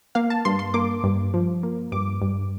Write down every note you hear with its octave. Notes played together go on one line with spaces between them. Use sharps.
A#3 F5
A5
G2 C6
C6
A#3 D6
G2
F3
A#3
G2 D6
G2